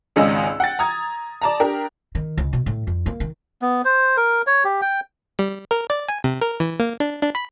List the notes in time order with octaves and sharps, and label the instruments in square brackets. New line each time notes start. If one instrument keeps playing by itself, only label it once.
[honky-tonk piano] G#1 C#2 G#3 C#4 D#5 E6
F#5 G5 A6
A#5 D#6 G#6
D5 A5 A#5
D4 G4 A#4
[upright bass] D#3
C#2
B2
A2
F2
A#3
D#3
[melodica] B3
C5
A#4
C#5
G4
G5
[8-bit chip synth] G3
A#4
D5
G#5
C3
A#4
E3
A#3
D4
D4
B5